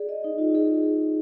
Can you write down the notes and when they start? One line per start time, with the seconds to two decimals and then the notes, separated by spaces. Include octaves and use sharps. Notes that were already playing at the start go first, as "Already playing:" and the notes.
Already playing: G#4 D5
0.09 D#5
0.24 D#4
0.38 F4
0.55 G#4